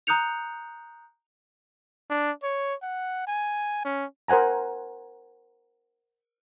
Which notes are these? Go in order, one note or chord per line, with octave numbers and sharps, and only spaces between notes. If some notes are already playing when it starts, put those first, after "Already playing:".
A#5 D#6 F#6 G6 C#7 F7
D4
C#5
F#5
G#5
C#4
A#4 C5 F#5 G#5 A#5